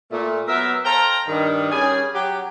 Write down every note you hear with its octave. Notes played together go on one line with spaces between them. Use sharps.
A#2 A3
F#3 B3 A#4 E5
A4 C5 F5 G5 A#5
G2 D#3
G3 C#4 G#4 G#5
F#3 G4